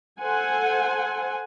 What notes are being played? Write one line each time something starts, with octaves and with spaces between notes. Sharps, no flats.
A4 C5 F#5 G#5